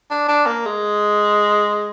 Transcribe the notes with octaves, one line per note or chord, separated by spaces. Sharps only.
D4
D4
A#3
G#3